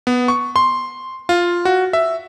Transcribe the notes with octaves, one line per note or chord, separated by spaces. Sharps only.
B3
C#6
C6
F4
F#4
E5